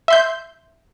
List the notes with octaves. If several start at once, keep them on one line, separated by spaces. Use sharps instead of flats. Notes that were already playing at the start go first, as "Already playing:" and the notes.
E5 C6 G6